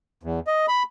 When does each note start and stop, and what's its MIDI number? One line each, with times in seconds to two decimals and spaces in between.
0.23 0.40 40
0.47 0.66 75
0.68 0.83 83